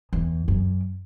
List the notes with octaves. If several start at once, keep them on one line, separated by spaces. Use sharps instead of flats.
E2
F#2